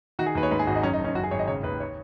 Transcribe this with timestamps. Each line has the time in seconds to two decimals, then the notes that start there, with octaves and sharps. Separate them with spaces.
0.19 D#3 F#4
0.26 G#4
0.35 D#2 B4
0.43 C#5
0.51 G#2 B4
0.59 G#4
0.67 G#1 F#4
0.76 D#4
0.83 F#2 C#4
0.93 D#4
0.99 F#1
1.04 C#4
1.15 F#2 F#4
1.23 G#4
1.31 G#1 C#5
1.39 D#5
1.47 C#3 C#5
1.63 D#2 B4
1.80 C#5